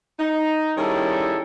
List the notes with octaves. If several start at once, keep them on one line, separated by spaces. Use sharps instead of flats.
D#4
D#3 G3 C#4 E4 G#4 A4